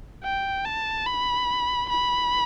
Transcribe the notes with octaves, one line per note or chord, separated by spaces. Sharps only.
G5
A5
B5
B5